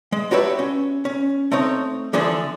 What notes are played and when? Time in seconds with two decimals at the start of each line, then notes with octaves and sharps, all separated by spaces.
0.12 G#3
0.31 D4 F#4 G4 B4 C#5 E5
0.59 C#4
1.05 C#4
1.52 A3 C4 D#4 C#5
2.13 D3 E3 F3 D4 G#4